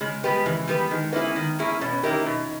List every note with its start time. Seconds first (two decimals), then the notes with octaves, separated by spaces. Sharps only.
0.01 C#3 G#3
0.23 G3 G#3 B3 G4 B4
0.46 C#3 E3
0.68 G3 B3 G4 B4
0.91 D#3 G#3
1.13 A#3 B3 C#4 E4 G#4
1.36 D#3
1.59 A#3 C#4 E4 G#4
1.81 B2 C#4
1.93 C#4
2.03 A#3 D#4 E4 G4 A#4
2.26 B2 D#4